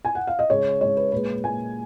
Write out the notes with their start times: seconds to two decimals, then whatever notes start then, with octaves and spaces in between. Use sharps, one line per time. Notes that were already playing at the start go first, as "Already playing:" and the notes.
0.05 G#5
0.15 F#5
0.27 F5
0.39 D#5
0.50 C#3 G#3 C#5
0.81 C#3 G#3 C#5
0.97 B4
1.12 A#2 G#3 B4
1.43 A#2 G#3 G#5